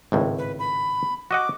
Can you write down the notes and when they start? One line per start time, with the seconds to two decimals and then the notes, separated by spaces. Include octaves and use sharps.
0.12 G#1 C#2 A2
0.38 B4
0.59 B5
1.31 F#4 D#5 F#5 D6